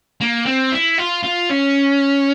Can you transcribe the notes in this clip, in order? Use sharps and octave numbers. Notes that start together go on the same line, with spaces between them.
A#3
C4
E4
F4
F4
C#4